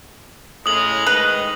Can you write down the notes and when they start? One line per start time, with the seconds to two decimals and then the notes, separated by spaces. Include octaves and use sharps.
0.66 A2 C#3 G#3 D#6 F#7
1.07 G#2 D#3 B4 D#5